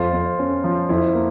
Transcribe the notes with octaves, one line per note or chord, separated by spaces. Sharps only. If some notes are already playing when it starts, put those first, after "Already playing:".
Already playing: F2 F4
F2
C#4
F3
F2 E4
A#3